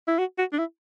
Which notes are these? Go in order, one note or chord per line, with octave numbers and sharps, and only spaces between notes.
E4
F#4
F#4
D4
E4